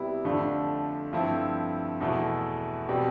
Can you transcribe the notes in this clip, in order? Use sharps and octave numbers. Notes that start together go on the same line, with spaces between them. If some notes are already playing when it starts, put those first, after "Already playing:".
Already playing: C3 G3 B3 E4
F2 D3 F3 A3 D4
G2 F3 A3 C4 E4
E2 B2 A3 E4
B2 G3 C4 G4